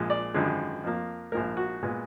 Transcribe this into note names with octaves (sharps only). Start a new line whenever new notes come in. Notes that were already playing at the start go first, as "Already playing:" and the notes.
Already playing: A#1 A#2 F3 G#3
D5
G#1 F#2 D3 F3 G#3
F2 F3 A#3
A#1 G#2 F3 A#3 A#4
F#4
A#2 G#3 B3